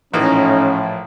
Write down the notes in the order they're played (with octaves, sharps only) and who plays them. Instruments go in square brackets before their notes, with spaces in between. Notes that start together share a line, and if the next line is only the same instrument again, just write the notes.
[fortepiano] A#1 E3 A#3 [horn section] A2 F3 [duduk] C#4 [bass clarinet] D#4